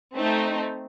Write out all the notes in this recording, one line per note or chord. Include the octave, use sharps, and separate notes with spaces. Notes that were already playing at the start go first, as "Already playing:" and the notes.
A3 C4 D#4